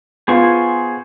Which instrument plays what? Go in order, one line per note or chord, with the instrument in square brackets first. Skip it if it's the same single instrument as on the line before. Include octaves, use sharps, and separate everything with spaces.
[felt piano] B3 F4 [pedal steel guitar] G#4 C5 C#6